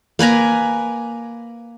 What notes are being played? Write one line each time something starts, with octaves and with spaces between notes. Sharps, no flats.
A#3 B4 G#5 A#5